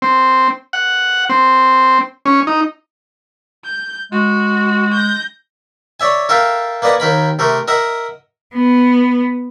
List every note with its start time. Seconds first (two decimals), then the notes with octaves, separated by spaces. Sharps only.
0.02 C4
0.73 F#5
1.30 C4
2.26 C#4
2.47 D#4
3.64 G6
4.12 G#3 F#4
4.93 G6 A#6
6.00 C#5 D5 E5 G#5
6.29 A4 A#4 E5 F5 G5
6.82 A#3 B4 D5 D#5 F#5 G#5
7.00 D#2 D#3 A#4 B5
7.39 C3 A3 A#4
7.68 A#4 D#5 E5 F#5
8.54 B3